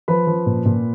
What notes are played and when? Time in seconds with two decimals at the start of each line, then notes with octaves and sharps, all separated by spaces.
0.08 F3 B4 B5
0.27 F3
0.46 A#2
0.66 A#2